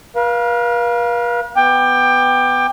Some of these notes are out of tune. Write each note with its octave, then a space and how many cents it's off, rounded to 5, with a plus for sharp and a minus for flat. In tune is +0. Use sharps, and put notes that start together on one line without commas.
B4 -45 F5 +0
B3 +10 G5 +20 D6 +20